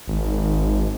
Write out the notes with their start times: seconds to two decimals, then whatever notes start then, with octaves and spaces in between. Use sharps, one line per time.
0.07 G#1